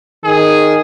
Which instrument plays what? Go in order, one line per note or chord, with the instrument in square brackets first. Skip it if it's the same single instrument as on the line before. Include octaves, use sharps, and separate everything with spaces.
[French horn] D#3 [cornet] G#4